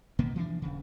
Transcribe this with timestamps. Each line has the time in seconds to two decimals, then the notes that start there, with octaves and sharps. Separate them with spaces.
0.19 G1 B2 A#3 B3
0.36 E3 F3 D4
0.62 D#1 C#3